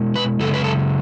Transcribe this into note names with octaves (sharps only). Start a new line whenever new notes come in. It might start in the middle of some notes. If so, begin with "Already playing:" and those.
Already playing: B2 G#3
B4
F#2 C#3 G#3 A4
B4
A4